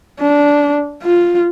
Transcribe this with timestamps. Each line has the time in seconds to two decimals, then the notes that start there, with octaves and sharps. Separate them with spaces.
0.21 D4
1.03 F4